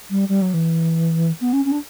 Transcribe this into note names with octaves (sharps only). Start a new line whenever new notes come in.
G3
G3
F#3
E3
B3
C#4
C#4
D4